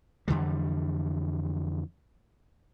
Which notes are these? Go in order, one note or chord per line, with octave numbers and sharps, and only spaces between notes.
F2 D3 E3 G3